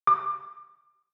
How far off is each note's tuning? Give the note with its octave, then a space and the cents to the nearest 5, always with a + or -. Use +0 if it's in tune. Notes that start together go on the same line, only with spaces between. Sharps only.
D6 +30